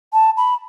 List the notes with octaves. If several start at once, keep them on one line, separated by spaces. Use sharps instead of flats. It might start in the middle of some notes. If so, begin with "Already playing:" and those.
A5
B5